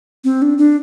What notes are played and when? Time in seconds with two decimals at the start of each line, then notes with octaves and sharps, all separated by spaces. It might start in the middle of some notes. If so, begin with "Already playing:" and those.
0.24 C4
0.42 D4
0.58 D4